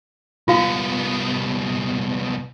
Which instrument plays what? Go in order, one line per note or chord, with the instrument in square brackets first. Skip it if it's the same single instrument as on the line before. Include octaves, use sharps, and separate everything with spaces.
[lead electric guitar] C2 B3 [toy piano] F4 F#4 F5